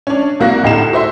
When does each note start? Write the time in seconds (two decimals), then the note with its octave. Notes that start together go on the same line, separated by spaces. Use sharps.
0.07 C#4 D4
0.40 C2 A#3 F#4 F#6 A#6
0.63 D2 A2 D#4 G4 C7 E7
0.93 F#4 C5 E5 C6